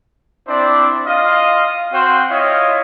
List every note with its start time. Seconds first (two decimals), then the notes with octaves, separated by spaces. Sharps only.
0.47 C4 D4 E4 C5 D5
1.06 F4 D#5 F5
1.91 C4 F#4 C5 F5 G5
2.30 E4 F4 C#5 D#5 F5